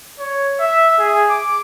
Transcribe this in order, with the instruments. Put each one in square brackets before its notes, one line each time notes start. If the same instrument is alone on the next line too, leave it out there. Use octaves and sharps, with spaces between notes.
[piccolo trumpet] C#5
E5
G#4
D6